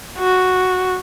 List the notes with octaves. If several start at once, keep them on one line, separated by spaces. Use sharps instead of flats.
F#4